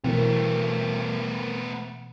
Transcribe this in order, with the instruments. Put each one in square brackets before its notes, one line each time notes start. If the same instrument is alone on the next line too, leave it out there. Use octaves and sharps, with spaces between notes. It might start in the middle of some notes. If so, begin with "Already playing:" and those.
[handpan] B2 E3 [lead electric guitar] A3 B3 [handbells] C4 A#4